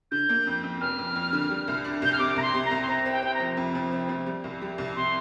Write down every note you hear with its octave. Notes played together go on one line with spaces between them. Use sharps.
D3 G6
A#3
F2
F2
F1 F6
F2
F2
D3
G3
C2
D4
C2 G6
F6
C3 D6
C2 A#5
C6
C3
A#5
C2
C6
C4 A#5
C4
G5
C4 G5
A#5
F3
F2
F3
C4
F3
G3
C2
G3
C2
C3 C6